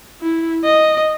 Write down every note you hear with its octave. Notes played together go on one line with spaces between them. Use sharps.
E4
D#5